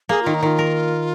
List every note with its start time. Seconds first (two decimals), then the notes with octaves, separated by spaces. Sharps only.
0.09 A#3 G#4
0.23 D#3 F4
0.34 D#4
0.43 D#3 F4
0.59 A#4